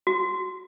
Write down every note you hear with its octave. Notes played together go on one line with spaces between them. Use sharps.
F#4